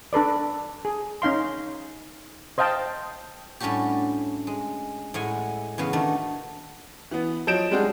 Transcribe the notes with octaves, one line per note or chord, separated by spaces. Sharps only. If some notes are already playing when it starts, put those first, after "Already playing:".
D4 A4 B4 D5
G#4
C#4 D#4 F5 C6
C5 D#5 F5 G5 A5
A2 G3 C#4 D4 F#4 G4
G#3
A2 G#3 F#5 G#5
E2 C#3 B3 F#4 F5
D#3 A3 D4
E3 B3
F3 F#3 D#5 G6 D7 E7
G3 G#3 C4 D4 F#4 G#4